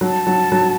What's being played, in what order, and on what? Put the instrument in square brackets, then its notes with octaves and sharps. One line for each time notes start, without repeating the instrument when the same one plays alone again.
[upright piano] F#3 [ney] A5
[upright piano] F#3
F#3